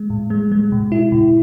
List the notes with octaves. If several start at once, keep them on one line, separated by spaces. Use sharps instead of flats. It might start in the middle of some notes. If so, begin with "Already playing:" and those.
Already playing: G#3
A2
G#3
G#3
B2
E4
B2